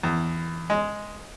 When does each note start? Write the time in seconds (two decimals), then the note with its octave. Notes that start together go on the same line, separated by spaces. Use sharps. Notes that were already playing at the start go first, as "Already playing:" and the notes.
0.03 E2
0.70 G#3